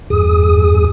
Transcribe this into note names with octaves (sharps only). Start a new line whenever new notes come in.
E2 G2 G#4 D#6